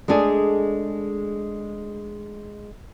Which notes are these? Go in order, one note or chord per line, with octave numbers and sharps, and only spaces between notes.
G#3 A3 D4 G#4